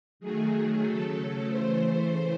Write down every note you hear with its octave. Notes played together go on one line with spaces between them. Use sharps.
D#3 F#3 A3 G#4
C#3 F#3 A3 A4
C#3 E3 A3 C5